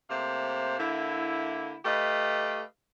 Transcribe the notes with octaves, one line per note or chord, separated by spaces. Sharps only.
C3 A3 A#3 C5
D3 A#3 E4
A3 G4 B4 D#5 F5